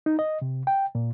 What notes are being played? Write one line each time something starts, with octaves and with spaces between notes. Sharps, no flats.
D#4
D#5
C3
G5
A#2